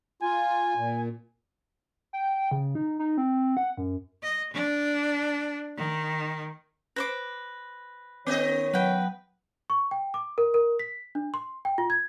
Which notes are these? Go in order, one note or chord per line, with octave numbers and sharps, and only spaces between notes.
F4 G#5
A#2
G5
C#3
D#4
D#4
C4
F#5
F#2
D#5
D4
D#3
B4 C5 D6 A#6
D#3 B3 C#5 D#5
F#3 B4 F#5 G5
C#6
G5
D6
A#4
A#4
B6
D4
C6
G5
F4
G#6